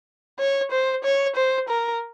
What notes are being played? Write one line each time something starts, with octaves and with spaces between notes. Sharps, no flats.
C#5
C5
C#5
C5
A#4